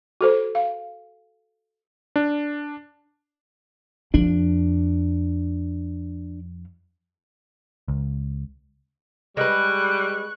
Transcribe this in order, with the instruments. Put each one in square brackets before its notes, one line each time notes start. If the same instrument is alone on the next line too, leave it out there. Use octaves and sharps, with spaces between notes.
[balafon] F#4 A4 C5
F5
[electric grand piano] D4
[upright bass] F2 [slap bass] D4
[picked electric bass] C#2
[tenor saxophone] G3 [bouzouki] G#3 B4 [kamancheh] C#6 F#6